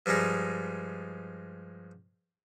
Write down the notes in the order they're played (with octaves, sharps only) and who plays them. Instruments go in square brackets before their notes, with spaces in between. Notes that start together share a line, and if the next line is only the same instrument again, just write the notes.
[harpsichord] G2 F3 G3 G#3 D#4